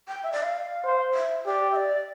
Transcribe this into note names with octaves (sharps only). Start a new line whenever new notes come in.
G5
E5
D5
F5
C5
E5
G4 D5
E5
D5